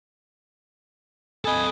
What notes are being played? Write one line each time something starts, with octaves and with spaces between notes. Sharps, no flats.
A4 D#5 G#5 B5 D#6